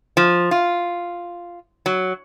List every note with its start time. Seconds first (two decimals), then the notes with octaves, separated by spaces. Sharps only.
0.17 F3
0.51 F4
1.86 F#3